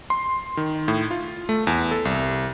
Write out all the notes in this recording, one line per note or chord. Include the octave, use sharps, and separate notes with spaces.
C6
D#3
A2
F4
A3
E2
A4
C2